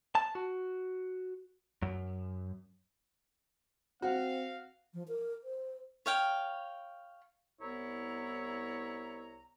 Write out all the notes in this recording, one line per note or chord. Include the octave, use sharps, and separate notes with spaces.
A5
F#4
F#2
C4 F#4 F5
F3
A#4
C5
C#5 F5 G5
C2 B3 E4 C#5 A#5